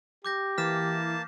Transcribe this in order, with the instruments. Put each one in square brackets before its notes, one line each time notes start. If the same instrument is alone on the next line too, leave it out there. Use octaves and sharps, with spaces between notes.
[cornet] G4 [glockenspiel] D6 G6 A#6
[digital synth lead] E3 [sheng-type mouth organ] A#3 A5 [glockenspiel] F6 B6 E7